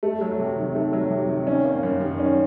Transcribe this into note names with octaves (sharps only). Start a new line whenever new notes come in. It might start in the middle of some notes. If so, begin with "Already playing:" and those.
A3
F#3
C3
D#3
A3
F#3
C3
D#3
C#4
A#3
F#2
D#3
C#4